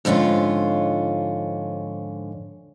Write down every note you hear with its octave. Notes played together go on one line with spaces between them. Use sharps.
F2 G#2 D3 C#4 F4